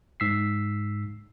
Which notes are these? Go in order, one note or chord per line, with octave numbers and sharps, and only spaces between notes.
G#2 E6 B6 C7